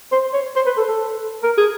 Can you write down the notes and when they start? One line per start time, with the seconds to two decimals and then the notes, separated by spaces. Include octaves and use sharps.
0.12 C5
0.34 C#5
0.56 C5
0.67 B4
0.78 A4
0.89 A4
1.43 A#4
1.58 G#4